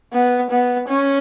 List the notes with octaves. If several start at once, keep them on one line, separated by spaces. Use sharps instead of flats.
B3
B3
C#4